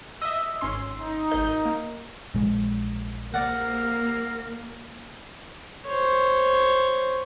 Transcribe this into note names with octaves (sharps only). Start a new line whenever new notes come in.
D#5 E5 E6
G#1 C#4 C6
D#4
G#1 A#4 D#5 G6
A#3
A#1 G#3
A#3 A#4 D5 F#5
C5 C#5